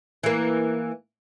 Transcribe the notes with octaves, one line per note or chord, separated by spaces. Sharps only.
E3 A#3